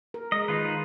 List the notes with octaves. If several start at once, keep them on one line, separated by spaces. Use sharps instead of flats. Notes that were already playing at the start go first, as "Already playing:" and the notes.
A#4
G#3 D#5
D#3 D#4 F4 B4